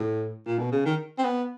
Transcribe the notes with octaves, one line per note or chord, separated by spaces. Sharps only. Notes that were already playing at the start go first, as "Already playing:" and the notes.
Already playing: A2
A#2
B2
C#3
D#3
C4
B3